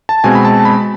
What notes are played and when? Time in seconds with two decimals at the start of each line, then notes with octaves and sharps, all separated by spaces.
0.09 A5
0.24 B2 G#3 C4 G#5
0.35 B5
0.45 A5
0.65 B5